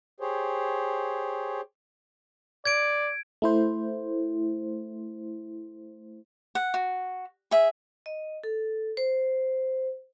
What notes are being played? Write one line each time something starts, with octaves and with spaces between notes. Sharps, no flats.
G4 G#4 C5 C#5
D5 G#6 D7
A3 E4 C5
F#5
F#4
G#4 E5
D#5
A4
C5